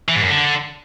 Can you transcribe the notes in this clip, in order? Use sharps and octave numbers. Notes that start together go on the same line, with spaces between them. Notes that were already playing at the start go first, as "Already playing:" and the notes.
E3
G#2
F#2
D3